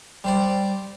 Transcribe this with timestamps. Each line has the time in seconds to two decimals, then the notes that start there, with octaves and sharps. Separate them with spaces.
0.24 G3 C5 D5